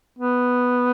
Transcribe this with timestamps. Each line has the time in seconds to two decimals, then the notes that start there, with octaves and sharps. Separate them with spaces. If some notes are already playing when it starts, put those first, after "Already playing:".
0.19 B3